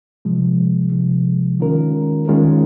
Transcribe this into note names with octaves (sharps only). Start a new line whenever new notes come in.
C3 F3 G#3
C3 F3 G#3
D#3 G#3 C#4 F4 A#4
D#3 G#3 C#4 F4 A#4